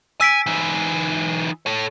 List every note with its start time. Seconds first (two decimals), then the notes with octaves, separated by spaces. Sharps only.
0.21 G#5 E6 B6 D7
0.46 E3 D#4
1.66 A4 C#5